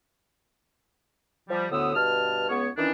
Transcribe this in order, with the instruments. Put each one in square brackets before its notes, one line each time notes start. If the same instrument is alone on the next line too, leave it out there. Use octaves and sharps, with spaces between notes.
[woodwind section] F3 G3
D2 A2 D3 B3 D#6 E6
G2 B2 A5 F6
C#2 B3 C#5
D#3 E3 C#4 D4